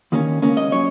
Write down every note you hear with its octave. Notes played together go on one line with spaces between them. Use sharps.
D#2 D#3 A#3 C#4
C#2 C#3 A#3 C#4
D#5
F#3 C#4 C#5